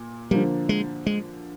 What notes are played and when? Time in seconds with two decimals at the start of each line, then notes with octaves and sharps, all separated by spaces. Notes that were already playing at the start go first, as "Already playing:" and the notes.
Already playing: A#2
0.31 D3 F3 G3 A#3
0.69 G#3
1.06 G#3